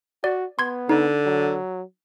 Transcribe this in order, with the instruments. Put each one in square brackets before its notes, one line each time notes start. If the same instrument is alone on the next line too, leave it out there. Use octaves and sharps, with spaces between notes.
[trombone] F#4 [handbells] D5
[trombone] B3 [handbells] C6 G#6
[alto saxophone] D3 [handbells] D#4
[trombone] F#3